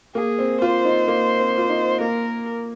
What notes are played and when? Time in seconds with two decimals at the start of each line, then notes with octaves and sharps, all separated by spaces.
0.14 A#3 G#4
0.39 C4
0.61 F4 C5
0.85 D#4
1.08 A#3
1.39 C4
1.58 F4
1.69 D#4
2.00 A#3 A#4